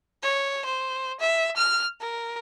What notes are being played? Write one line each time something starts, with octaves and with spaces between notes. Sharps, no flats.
C#5
C5
E5
F6
A#4